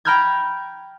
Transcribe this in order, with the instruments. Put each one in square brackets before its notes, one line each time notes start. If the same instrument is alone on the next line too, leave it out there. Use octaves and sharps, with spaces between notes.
[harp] G5 A#5 B5 F6 G6 G#6